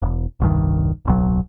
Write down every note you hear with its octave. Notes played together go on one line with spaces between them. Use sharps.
E1
E1 C2 G2 D#3
D1 B1 F#3